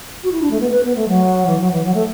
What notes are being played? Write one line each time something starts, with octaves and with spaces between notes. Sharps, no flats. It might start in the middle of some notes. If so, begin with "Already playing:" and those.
F#4
E4
D4
A3
B3
B4
B3
A3
F#3
E3
F#3
E3
F#3
A3